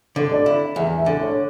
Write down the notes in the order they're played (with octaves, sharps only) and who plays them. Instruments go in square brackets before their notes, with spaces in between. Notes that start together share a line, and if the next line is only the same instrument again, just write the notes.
[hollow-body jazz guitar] D3
[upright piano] D5
[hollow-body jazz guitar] E4
[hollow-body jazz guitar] E2 [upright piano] E5
[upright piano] E5
[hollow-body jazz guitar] D3
[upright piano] C#5